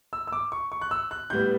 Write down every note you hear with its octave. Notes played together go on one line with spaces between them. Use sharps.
E6
E6
D6
C#6
C#6
F#6
E6
F#6
A2 G3 B3 G6